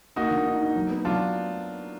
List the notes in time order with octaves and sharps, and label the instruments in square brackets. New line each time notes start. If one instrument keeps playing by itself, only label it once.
[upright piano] A#3 [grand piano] D#4 F#4
[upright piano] D3
D#4
D#4
F#3
B3
[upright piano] F#3 [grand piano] D4 F4